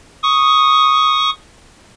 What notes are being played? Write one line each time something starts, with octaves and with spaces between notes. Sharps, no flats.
C#6 D#6